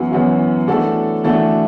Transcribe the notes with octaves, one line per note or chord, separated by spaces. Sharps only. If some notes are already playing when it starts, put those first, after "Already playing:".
Already playing: F#2 E3 B3 F#4
F#2 E3 B3 F#4
E3 A3 D4 F#4 A4
E3 A3 D4 F#4 A4